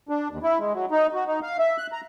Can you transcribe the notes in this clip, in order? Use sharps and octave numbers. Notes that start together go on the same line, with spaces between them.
D4
D#2
E4
G#3
F#3
D#4
F#4
D#4
F5
E5
F#6
A#5